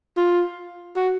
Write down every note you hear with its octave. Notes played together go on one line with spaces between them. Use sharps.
F4
F#4